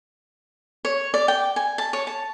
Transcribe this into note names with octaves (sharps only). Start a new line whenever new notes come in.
C#5
D5
G5
G#5
A5
C#5
A5